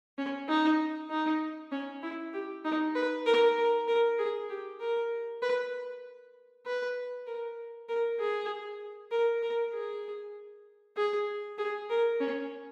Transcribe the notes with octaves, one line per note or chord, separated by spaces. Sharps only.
C#4
D#4
D#4
C#4
E4
G4
D#4
B4
A#4
A#4
A#4
G#4
G4
A#4
B4
B4
A#4
A#4
G#4
A#4
A#4
G#4
G#4
G#4
A#4
C#4